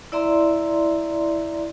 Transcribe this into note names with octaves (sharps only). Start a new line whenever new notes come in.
E4 D5 E5 A#5 C6